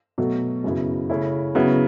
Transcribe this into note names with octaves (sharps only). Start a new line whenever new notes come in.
B2 F#3 A3
F#2 C#3 F#3 B3 E4
C#3 A3 C#4 E4
C#3 F#3 B3 E4